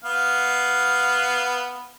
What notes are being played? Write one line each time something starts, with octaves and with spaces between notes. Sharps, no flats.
B3 F5